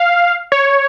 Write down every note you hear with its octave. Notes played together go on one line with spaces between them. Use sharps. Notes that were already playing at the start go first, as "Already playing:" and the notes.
Already playing: F5
C#5